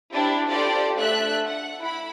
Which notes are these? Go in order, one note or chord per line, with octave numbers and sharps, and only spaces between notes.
D4 E4 G4 C5
F4 G4 A4 C5 D5
A3 D4 E5 F#6
F#5
E4 B5